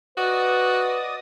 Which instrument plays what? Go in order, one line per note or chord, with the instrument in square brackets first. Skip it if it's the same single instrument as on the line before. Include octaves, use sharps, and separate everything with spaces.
[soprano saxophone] F#4 [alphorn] B4 [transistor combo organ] D5 D#5 D#6